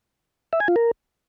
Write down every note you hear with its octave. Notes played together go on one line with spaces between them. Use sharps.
E5
G#5
F4
A#4